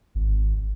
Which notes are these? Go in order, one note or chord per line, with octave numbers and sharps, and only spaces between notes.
G#1